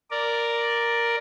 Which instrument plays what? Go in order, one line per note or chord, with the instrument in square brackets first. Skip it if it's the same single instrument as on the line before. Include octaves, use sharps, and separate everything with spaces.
[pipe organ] A#4 D5